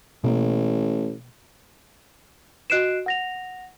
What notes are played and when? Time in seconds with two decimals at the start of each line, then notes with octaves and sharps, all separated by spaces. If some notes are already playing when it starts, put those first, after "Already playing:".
0.24 A1 B2 A#3
2.70 F#4 D#5 F#6 C7 D7 E7
3.06 F#5 A#6 F7